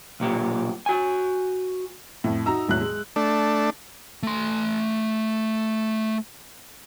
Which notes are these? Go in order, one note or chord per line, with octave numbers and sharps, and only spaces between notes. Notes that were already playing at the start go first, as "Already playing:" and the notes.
B1 A#2 G4
F#4 G#5
F2 A2
D#4 F#4 A#5 E6
E1 A2 F#3 F#6
G#3
A3 D4
A3 C6